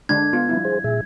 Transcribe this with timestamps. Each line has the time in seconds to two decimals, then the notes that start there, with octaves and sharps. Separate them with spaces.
0.09 D3 G#3 D4 G#6
0.33 B3 F4
0.49 F3 G3 E4
0.65 G#4 C5
0.84 A#2 G#4 E5